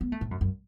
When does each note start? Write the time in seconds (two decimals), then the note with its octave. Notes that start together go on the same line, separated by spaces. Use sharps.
0.01 B3
0.12 A3
0.21 A2
0.31 F#2
0.41 F#2